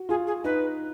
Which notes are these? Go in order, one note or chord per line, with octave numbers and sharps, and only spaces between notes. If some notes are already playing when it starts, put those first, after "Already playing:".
Already playing: F#4
F4 G#4
G#4
D#4 B4